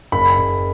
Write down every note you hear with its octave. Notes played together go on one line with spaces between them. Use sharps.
F#1 B5
F#1